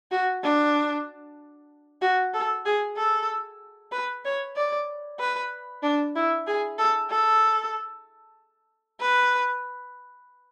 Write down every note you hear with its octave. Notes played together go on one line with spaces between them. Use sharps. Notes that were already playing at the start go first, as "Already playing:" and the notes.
F#4
D4
F#4
A4
G#4
A4
B4
C#5
D5
B4
D4
E4
G#4
A4
A4
B4